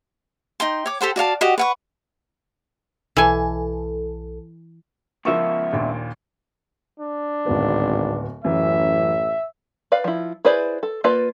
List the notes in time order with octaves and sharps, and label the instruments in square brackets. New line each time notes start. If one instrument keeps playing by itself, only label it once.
[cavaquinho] D#4 G5 C6
C#5 D6
G4 A4 C5 F#5
F#4 D5 F5 A5
F#4 G4 D#5 F#5
B4 F#5 C#6
[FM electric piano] B1 A4 [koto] E3 G#5
[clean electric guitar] C#2 B3 E5 [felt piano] F3 A#4 C#6
[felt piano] A#1 D#2 A#2
[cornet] D4
[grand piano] D1 B3 [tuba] G#1
[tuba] A1 [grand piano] F#2 E3 [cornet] E5
[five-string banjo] B4 D5 F5
F3 E4
E4 G#4 B4 C5 D5
A4
A#3 F4 B4 D5 A5